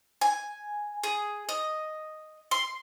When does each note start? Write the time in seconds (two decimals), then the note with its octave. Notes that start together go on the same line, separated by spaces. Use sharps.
0.21 G#5
1.04 G#4
1.49 D#5
2.51 C6